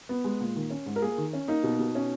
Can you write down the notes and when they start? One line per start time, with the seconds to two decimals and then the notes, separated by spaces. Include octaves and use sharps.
0.09 B3
0.24 G#3
0.41 A#2
0.56 D#3
0.70 C#4
0.86 G#2
0.96 A#4
1.02 A#3 G#4
1.18 D#3
1.33 C#4
1.48 A#3 D#4
1.63 B2
1.79 B2
1.95 C#4